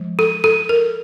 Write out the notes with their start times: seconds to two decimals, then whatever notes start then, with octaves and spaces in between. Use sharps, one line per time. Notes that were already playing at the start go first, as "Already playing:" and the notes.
Already playing: F3 G#3
0.19 A4
0.44 A4
0.69 A#4